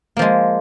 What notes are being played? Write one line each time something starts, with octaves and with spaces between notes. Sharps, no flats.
F3 G#3 A#3